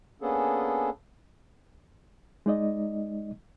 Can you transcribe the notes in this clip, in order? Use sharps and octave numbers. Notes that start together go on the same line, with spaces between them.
A#3 B3 C#4 D4 G#4 A4
G#3 D#4 D5 D#5